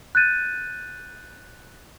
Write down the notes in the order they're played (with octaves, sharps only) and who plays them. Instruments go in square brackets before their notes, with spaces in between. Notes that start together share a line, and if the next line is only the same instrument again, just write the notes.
[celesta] F#6 G6 A6 D#7